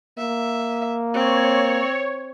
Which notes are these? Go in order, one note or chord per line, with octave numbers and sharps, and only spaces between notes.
A#3 E5
C4 C#5